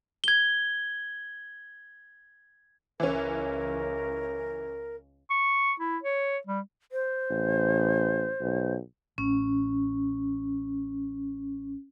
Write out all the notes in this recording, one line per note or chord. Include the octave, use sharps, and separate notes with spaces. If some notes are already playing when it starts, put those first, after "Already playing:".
G#6 G7
C#2 E3 C#4 A#4
C#6
E4
C#5
G3
C5
A1
B1
A1 C#4